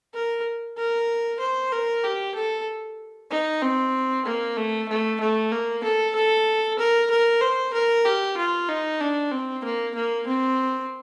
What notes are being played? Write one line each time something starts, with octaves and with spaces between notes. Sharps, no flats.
A#4
A#4
C5
A#4
G4
A4
D#4
C4
A#3
A3
A3
A3
A#3
A4
A4
A#4
A#4
C5
A#4
G4
F4
D#4
D4
C4
A#3
A#3
C4